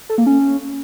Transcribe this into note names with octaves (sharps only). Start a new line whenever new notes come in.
A4
A#3
C#4